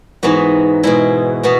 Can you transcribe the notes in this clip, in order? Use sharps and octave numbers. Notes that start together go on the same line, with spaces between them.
G#2 E3 B3 F#4
B2 G#3 E4
B2 B3 F#4